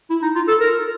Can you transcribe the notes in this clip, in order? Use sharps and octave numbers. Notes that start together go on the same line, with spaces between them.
E4
D#4
F4
A4
A#4